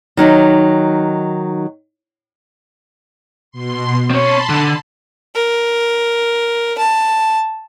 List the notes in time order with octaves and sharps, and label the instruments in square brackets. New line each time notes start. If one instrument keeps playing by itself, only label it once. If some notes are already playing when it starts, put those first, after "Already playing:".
[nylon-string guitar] D#3 F#3 D#4
[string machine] B2 C6
[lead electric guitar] C4 C#5 [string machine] A5 B5 C6
[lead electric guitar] D3
[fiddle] A#4
A5